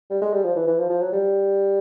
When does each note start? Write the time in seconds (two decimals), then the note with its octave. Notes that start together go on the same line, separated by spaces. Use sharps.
0.10 G3
0.22 G#3
0.33 G3
0.44 F3
0.56 E3
0.67 E3
0.79 F3
0.90 F3
1.01 F#3
1.12 G3